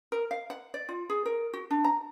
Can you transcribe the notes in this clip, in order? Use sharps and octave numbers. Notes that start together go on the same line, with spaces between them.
A#4
F5
F#5
D5
F4
G#4
A#4
F#4
D4
A#5